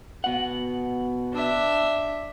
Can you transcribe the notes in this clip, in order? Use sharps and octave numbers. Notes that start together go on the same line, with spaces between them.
B2 F#5
D4 E5